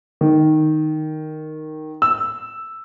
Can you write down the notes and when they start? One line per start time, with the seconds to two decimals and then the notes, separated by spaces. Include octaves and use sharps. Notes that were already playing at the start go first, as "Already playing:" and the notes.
0.21 D#3
2.02 E6